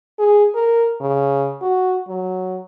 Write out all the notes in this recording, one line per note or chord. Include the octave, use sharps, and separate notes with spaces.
G#4
A#4
C#3
F#4
F#3